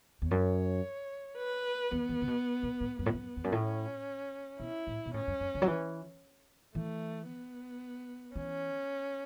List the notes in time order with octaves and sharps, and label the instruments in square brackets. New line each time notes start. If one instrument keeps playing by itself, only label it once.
[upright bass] E2
[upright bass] F#2 [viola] C#5
[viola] B4
[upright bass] E2 [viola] B3
[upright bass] E2
C#3
B2
B2
A2
[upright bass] F#2 [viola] B3
[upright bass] A2
F#2
E2
F#2
[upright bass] A2 [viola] C#4
[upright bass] B2 [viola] E4
[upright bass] A2
B2
[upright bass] A2 [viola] C#4
[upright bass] F#2
F#2
C#3
F#3
E3
[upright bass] E3 [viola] A3
[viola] B3
[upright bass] E3 [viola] C#4